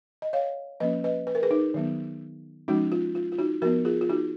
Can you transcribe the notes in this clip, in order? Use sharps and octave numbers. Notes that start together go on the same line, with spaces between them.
D#5
C#5 F5
F3 A#3 C#4 B4 D#5
B4 D#5
B4
A#4
G#4 B4
D#4
D#3 F#3 B3
F3 G#3 C#4 D#4 F#4
F4
F4
F4
D#4 F#4
F3 B3 F#4 A#4
F4 G#4
F4
D#4 F#4